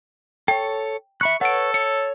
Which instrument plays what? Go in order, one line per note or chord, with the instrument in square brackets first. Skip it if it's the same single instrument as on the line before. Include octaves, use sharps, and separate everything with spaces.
[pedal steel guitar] A4 C#5 [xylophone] G5
[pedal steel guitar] E5 B5 F#6 [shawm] C#6
[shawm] A4 [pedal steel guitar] B4 C#5 C#6 [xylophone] F#5 D7
[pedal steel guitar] C#5 [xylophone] C#7